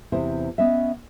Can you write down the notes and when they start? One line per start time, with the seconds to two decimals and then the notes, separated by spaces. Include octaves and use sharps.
0.12 E2 C3 E4 C5
0.58 B3 C#4 D#5 E5